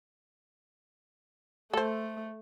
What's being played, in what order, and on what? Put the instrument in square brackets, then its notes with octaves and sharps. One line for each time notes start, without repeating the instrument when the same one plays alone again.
[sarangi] A3 [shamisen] A4 C5